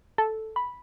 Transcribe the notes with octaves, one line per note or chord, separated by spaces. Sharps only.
A4
B5